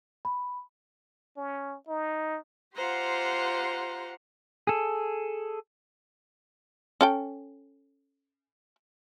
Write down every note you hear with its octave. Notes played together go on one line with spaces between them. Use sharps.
B5
C#4
D#4
F4 G4 C5 F#5 A#5 C6
G#4 A4
C#4 A4 G5